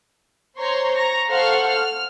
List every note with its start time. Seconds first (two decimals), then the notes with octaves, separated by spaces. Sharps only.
0.57 C5 C#5 A#5 C6 C#6
0.97 A#5 C#6 A#6
1.28 A4 C5 F5 F#5 C#6 F6
1.70 F6